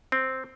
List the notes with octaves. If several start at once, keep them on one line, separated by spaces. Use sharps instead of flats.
C4